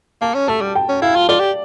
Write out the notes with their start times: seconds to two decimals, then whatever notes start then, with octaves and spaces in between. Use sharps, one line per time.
0.21 A#3 A5
0.35 C#4
0.48 A3 A5
0.61 G3
0.75 G5
0.89 C#4
1.02 E4 F5
1.16 F4
1.29 F4 D5
1.40 G4